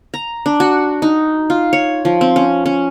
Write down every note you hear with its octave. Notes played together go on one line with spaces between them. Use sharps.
A#5
D4
F#4
D#4
F4
C#5
F3
C4
C#4
C#4